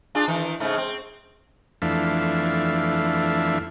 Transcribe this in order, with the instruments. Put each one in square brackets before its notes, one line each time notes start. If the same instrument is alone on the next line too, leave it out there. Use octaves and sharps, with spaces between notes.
[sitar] D4 F4 G#4
D#3 E3 D#4
G#2 C#3 A3
C4
[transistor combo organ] F2 E3 A3 D4 E5 F5